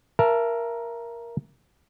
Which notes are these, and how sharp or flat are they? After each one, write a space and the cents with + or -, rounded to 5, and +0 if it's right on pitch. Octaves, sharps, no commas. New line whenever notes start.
A#4 +10 E5 +30 A5 +0